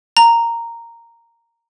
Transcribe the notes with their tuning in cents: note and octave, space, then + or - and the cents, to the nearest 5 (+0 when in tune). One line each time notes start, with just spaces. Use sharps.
A#5 -5